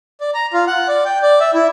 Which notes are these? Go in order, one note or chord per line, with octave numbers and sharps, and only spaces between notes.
D5
A#5
F4
F#5
D5
G5
D5
E5
E4